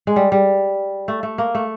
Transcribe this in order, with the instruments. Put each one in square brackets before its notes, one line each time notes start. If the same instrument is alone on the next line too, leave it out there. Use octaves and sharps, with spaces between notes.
[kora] G#3
G3
G3
A3
A3
A#3
A3